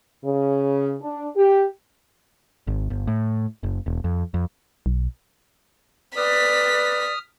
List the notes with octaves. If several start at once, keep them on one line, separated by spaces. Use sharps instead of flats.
C#3
D4
G4
G#1
G1
A2
F#1
E1
F2
F2
B1
B4 D5 D#6 F6 B6